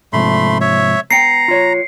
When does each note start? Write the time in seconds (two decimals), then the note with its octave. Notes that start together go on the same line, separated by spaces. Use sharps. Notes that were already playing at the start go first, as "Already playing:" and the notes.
0.13 G#2 C3 F3 A3 B5 C6
0.61 C#5 E5
1.11 B3 G5 A#5 C7 C#7
1.48 F4 C#5